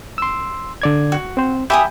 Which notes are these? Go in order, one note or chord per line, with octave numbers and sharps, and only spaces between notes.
C6 E6
D3 D5 G#6
F#4
C4 C5
G4 E5 G#5 B5 D#6 G6